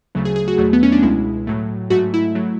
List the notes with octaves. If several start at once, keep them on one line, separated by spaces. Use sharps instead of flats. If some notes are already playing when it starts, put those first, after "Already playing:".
D2 C#3 F#3 A3
G#4
G#4
F#4
E2 B2 F#3 A3
B3
C#4
D4
C#2 B2 G#3 E4
A2 F#3 A3
G#2 F#3 A3 F#4
E4
F#3 A3